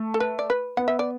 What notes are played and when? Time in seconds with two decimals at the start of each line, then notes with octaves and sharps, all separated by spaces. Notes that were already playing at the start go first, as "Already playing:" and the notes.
Already playing: A3
0.14 A4
0.20 B4
0.39 D5
0.50 B4
0.77 B3 F#5
0.88 E5
0.99 D5